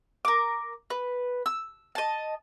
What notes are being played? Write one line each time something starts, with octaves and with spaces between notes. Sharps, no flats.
A#4 D6
B4
E6
D#5 A5